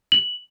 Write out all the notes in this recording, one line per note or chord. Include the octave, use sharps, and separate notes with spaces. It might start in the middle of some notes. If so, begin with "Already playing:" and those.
F#7